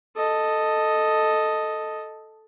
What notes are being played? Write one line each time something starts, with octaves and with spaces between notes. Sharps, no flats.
A4 D#5